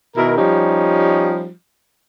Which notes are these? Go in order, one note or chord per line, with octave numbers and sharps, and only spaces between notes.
B2 D#3 E4 A#4
F3 G3 C#4 D#4 G4